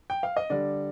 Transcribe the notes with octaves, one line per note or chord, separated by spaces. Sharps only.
G5
F5
D#5
D3 G3 D5